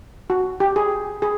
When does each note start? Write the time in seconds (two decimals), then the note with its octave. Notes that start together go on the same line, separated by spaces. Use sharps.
0.30 F#4
0.60 G4
0.76 G#4
1.22 G#4